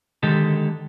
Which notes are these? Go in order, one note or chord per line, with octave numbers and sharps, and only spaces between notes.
D3 D#3 G#3 G4 A4